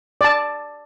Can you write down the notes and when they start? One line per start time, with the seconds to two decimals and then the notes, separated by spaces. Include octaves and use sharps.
0.21 D5 A5